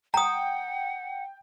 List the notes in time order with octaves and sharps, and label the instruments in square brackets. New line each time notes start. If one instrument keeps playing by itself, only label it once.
[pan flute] F#5 [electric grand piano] G5 [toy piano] A#5 D#6